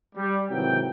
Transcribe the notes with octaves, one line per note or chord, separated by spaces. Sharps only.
G3
G#1 C3 E3 F#3 G5